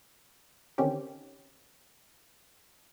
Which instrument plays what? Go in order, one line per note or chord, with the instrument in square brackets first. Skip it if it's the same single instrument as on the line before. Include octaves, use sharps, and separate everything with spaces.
[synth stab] D3 D#3 C4 C#4 G4